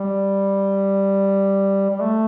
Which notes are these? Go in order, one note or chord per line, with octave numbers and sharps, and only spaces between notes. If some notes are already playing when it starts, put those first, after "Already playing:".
Already playing: G3
G3
A3